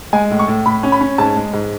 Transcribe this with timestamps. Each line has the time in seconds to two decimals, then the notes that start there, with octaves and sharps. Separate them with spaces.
0.13 G#3 G#5
0.31 A2
0.39 C#6
0.48 A2
0.66 A2 B5
0.83 C#4
0.92 B5
1.01 C#4
1.18 G#2 A5
1.36 G#3
1.53 G#2